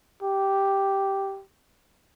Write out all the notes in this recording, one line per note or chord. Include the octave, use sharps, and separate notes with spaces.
G4